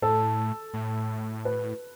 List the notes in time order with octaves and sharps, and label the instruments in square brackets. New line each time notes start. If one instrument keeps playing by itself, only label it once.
[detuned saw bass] A2 [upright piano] A4
[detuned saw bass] A2
[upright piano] B4